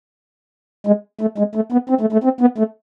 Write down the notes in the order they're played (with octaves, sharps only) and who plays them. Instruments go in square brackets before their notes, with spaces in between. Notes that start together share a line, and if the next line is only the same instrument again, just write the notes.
[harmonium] G#3
A3
G#3
A3
B3
C4
A3
A3
C4
B3
A3